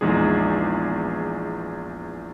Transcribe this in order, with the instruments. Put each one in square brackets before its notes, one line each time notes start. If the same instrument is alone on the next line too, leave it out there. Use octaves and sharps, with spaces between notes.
[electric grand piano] A#1 E2 G#3 D#4 G#4